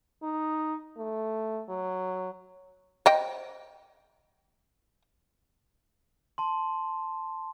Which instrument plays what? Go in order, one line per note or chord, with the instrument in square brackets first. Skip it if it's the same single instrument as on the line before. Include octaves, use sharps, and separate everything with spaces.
[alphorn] D#4
A3
F#3
[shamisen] C5 D#5 G5
[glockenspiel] A5 C6